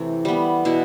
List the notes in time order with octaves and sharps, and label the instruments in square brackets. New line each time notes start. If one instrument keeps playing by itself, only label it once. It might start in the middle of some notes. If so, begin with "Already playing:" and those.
Already playing: [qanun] C3 E3 A3
G3 B3
B2 E4